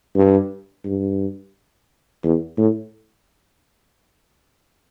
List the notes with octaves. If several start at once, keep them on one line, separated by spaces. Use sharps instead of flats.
G2
G2
E2
A2